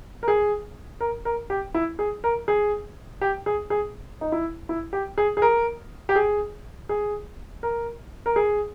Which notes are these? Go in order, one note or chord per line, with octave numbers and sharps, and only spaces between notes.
A#4
G#4
A#4
A#4
G4
E4
G#4
A#4
G#4
G4
G#4
G#4
D#4
E4
E4
G4
G#4
G#4
A#4
G4
G#4
G#4
A#4
A#4
G#4